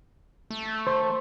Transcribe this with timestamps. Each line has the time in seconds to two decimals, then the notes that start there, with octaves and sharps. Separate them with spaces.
0.51 A3
0.87 C5